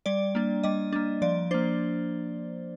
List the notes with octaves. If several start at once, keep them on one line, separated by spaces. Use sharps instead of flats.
G3 D5
A#3 D4
G3 D#5
A#3 D4
F3 D5
A#3 D4 C5